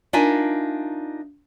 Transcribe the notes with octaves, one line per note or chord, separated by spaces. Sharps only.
D4 D#4 F4 A#4 E5 G#5